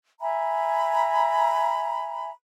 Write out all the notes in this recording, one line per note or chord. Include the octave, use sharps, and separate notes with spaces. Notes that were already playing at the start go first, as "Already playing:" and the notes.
E5 G#5 A#5 B5